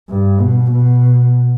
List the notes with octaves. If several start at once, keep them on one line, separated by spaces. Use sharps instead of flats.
G2
B2
B2